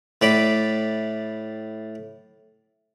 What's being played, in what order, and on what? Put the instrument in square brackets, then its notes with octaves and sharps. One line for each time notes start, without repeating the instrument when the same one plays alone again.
[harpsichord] A2 D5 B5